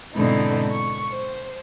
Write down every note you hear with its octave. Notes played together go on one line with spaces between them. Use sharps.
G#2 B2 D3 C4 D#4 E4
C#6
C5